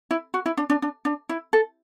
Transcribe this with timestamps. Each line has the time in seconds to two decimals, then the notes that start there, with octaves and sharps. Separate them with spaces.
0.11 E4
0.34 F#4
0.46 E4
0.57 D4
0.70 D4
0.82 D4
1.05 D4
1.29 E4
1.53 A4